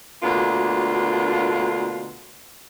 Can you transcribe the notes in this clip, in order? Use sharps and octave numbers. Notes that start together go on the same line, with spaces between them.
D2 B2 A#3 D4 F4